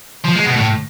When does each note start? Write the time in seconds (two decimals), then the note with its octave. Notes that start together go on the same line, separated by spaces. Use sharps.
0.25 F3
0.35 G#3
0.46 B2
0.56 A2